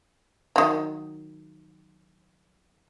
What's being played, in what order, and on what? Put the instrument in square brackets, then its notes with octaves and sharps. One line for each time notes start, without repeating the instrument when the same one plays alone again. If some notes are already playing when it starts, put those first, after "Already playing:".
[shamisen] D#3 F#3